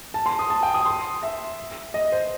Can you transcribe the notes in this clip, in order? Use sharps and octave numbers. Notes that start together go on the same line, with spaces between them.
A5
C6
D#6
A5
G5
D#6
C6
E5
D#5
C5